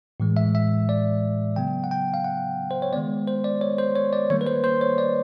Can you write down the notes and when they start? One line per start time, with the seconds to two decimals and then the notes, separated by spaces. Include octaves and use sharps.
0.20 A2 E3 G#3
0.37 E5
0.55 E5
0.89 D5
1.56 C#3 F#3 B3 G5
1.84 F#5
1.91 G5
2.14 F5
2.24 F#5
2.71 C5
2.82 C#5
2.93 D#3 G#3 B3 D5
3.28 C5
3.44 D5
3.61 C#5
3.78 C5
3.96 C#5
4.13 D5
4.30 D#3 G3 A#3 C#5
4.41 B4
4.46 C5
4.64 C5
4.81 C#5
4.98 D5